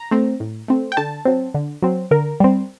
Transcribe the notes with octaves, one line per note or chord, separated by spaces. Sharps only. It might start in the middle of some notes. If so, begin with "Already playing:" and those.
Already playing: A#5
A3 C4
A2
A3 C4
G5
D3 A5
F#3 C4
D3
F#3 C4
D3 A#4
G3 C4